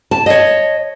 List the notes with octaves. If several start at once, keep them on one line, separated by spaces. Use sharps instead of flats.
A5
C#5 D#5